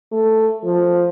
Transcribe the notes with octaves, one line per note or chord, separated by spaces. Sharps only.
A3
F3